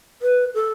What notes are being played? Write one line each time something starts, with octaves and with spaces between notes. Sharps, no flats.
B4
A4